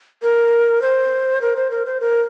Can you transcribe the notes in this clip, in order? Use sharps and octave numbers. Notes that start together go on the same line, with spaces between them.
A#4
C5
A#4
C5
A#4
C5
A#4